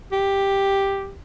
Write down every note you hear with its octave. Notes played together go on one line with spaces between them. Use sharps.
G4